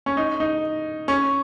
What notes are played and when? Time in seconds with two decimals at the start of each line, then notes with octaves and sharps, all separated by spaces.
0.06 C#4
0.17 D#4
0.40 D#4
1.08 C#4